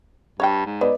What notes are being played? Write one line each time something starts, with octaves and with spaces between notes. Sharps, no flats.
G2 C#5 F5 G5
G#2
B3 B4 D5 D#5